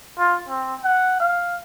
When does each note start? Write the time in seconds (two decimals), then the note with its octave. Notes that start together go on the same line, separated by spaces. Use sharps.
0.18 F4
0.48 C4
0.84 F#5
1.20 F5